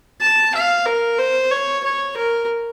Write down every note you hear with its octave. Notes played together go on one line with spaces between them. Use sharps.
A5
F5
A#4
C5
C#5
C#5
A#4